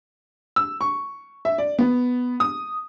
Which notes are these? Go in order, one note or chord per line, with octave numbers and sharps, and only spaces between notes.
E6
C#6
E5
D5
B3
D#6